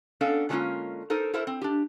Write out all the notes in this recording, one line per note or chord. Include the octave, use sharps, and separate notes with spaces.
B3 C#4 D4 A4 D#5 F5
D3 F#3 G#3 A#3 C#4 F4
D#4 A4 A#4 C5
E4 A4 A#4 C5 E5
C4
D4 G4